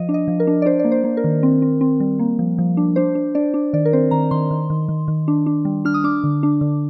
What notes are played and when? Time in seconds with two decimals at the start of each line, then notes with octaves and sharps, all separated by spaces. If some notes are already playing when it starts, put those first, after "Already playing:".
Already playing: F3 D#5
0.09 D4
0.14 D#5
0.28 F3
0.40 A#4
0.47 D4
0.62 D5
0.66 D4 C5
0.79 D5
0.85 A#3
0.92 C5
1.04 A#3
1.17 A#4
1.24 D#3
1.43 C4
1.62 C4
1.81 C4
2.00 G3
2.19 A#3
2.39 F3
2.58 F3
2.77 D4
2.96 D4 C5
3.15 D4
3.35 D4 D5
3.54 D4
3.73 D#3 D5
3.85 A#4
3.93 C4 C5
4.11 D#3 A#5
4.31 D#3 C6
4.51 D#3
4.70 D#3
4.89 D#3
5.08 D#3
5.28 D4
5.46 D4
5.65 G3
5.85 D4 F6
5.94 D#6
6.04 D4 D6
6.24 D3
6.43 D4
6.61 D3